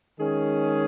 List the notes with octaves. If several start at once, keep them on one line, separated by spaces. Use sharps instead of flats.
D#3 G#3 C#4 G#4